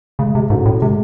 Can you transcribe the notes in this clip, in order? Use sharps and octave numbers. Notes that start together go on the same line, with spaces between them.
C#3 G#3
C3
G#2 C#4 F#4 A4
A2
C3 G#3